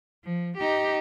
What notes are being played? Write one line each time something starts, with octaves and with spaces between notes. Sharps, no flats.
F3
D#4 G4